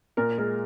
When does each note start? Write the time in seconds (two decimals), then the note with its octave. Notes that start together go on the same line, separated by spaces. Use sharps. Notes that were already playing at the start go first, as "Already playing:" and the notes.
0.17 A#2 A#4
0.38 G#3 A#4